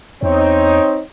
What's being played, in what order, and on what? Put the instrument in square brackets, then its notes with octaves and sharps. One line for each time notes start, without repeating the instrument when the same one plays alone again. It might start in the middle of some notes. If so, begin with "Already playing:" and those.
[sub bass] E2 [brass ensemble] C4 D#4 C#5